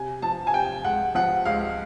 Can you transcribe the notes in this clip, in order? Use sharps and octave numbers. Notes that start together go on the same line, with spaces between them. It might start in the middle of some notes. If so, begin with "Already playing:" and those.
Already playing: C3 G#5
F3 A5
G#5
C3 G5
C#2 F#5
F3 F#5
C#2 F5